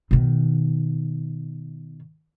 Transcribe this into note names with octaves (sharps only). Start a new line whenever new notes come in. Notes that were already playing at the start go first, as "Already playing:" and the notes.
B2 D#3